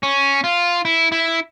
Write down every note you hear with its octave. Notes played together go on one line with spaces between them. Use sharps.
C#4
F4
E4
E4